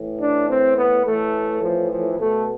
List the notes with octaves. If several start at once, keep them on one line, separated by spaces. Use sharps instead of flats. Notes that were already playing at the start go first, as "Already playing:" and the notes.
Already playing: A2 E3
D4
C4
B3
A2 E3 A3
F3
F3
B2 A3